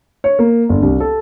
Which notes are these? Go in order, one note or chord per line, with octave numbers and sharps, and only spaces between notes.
C#5
A#3
G1
C2
A4